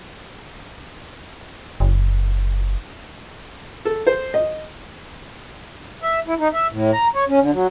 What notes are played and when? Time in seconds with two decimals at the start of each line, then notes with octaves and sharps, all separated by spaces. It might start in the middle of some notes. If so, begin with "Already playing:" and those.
1.80 F#1
3.85 A4
4.07 C5
4.34 D#5
6.03 E5
6.27 E4
6.39 D#4
6.54 E5
6.72 A2
6.93 A#5
7.15 C#5
7.29 C#4
7.40 D3
7.52 F#3